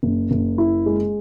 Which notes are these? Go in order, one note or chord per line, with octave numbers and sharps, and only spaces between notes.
F#1
F#1
E4
G#3